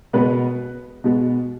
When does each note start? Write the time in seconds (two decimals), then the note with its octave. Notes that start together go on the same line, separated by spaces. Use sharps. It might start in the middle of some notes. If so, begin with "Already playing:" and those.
0.13 B2 G#3 B3 B4
1.04 B2 G#3 B3